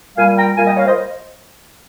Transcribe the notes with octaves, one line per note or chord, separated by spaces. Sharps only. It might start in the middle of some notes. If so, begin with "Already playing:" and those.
A#2 G3 F5 G#5
G5 A#5
A#2 G3 F5 G#5
D#5 G5
C#5 F5
C5 D#5